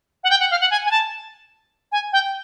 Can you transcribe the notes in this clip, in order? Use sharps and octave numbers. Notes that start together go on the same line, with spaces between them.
F#5
G5
F#5
F5
F#5
G#5
G#5
A5
G#5
G5